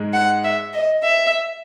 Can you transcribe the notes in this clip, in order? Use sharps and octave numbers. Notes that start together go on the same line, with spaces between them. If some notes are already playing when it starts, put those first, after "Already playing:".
Already playing: G#2 G#3
F#5
E5
D#5
E5